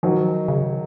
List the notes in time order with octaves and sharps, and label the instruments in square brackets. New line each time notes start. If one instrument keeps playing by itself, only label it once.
[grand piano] D#3 F#3 [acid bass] F3
[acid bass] C#3